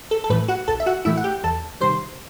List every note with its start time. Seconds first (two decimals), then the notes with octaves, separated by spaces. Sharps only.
0.11 A4
0.24 A4
0.30 A2 E3 A3 B4
0.48 F#4 F#5
0.68 B1 A4 A5
0.80 E5
0.86 F#4 F#5
1.05 A2 E3 A3 E4 E5
1.17 F#5
1.24 G4 G5
1.43 E2 A4 A5
1.81 C3 D#3 G3 C5 C6